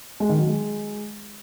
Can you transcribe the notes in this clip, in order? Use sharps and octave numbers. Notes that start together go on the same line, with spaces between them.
G#3
D#3
F#3
G#3